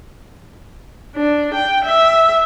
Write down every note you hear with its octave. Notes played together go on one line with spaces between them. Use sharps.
D4
G5
E5